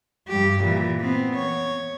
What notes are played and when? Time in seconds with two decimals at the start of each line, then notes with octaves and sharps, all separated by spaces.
0.28 G2 G4
0.61 A#2 E3
1.00 B3 C4
1.36 C#5